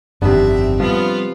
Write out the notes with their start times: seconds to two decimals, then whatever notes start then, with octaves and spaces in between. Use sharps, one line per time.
0.22 G1 F2 C3 D#3 B3 C4 D4 E5
0.80 F3 G3 B3 F4